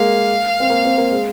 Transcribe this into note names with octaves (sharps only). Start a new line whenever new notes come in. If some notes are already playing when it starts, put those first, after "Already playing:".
Already playing: G#3 A#3 F5
C4
A#3
C4
A#3
G#3